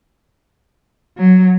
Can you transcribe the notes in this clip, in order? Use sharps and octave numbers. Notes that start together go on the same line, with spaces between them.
F#3